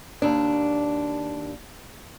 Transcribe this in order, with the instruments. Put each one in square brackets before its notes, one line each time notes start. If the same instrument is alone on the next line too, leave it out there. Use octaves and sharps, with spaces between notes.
[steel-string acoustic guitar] D#2 D4